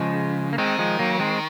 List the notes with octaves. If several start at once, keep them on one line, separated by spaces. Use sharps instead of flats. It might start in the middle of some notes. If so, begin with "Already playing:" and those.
Already playing: C#3 F3 G#3
A#3
D#3 G#3 C4
F3 G#3
F#3 A#3
G#3 C4